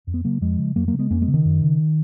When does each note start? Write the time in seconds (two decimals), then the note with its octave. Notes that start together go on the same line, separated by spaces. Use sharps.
0.07 F2
0.14 B3
0.24 C#3 F#3 A#3
0.41 F2 F3 G#3
0.59 C#3
0.76 F2 F#3 A#3
0.88 F#3 A#3
0.93 C#3
0.99 G#3 B3
1.10 F2 A#3 C#4
1.22 G#3 B3
1.28 C#3
1.34 D#3
1.45 F#2
1.62 C#3